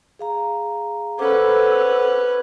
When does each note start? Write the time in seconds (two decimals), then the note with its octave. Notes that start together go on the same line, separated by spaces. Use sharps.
0.19 G#4 F5 A#5
1.19 C#4 A4 B4 C5 F#5 D6